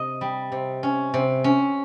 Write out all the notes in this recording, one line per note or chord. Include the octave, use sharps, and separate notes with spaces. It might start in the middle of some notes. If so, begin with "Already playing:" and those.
Already playing: C3 D#5
G3
C3
C#4
C3
C#4